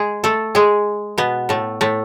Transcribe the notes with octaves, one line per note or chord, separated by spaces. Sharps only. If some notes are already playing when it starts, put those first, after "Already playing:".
Already playing: G#3 G#4
A3 A4
G#3 G#4
B2 B3
A2 A3
A2 A3